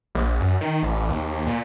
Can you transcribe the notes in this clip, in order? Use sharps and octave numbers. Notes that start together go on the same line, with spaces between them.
A#1
F#2
D#3
A1
D#2
A#2